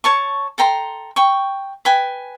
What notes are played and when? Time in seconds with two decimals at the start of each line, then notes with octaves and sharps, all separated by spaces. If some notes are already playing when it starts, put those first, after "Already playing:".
0.04 C#5 A5 C#6
0.58 A4 G5 A#5 C6
1.16 G5 C#6
1.85 B4 G5 G#5